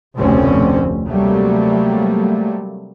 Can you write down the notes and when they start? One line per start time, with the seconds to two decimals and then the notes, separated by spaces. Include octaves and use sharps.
0.17 F1 D2 B2 C4 C#4
1.06 C3 F#3 G3 A3 A#3